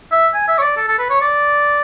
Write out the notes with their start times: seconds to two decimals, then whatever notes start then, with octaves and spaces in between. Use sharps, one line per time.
0.12 E5
0.34 G#5
0.48 E5
0.59 C#5
0.62 D5
0.77 A4
0.88 A4
0.99 B4
1.10 C#5
1.21 D5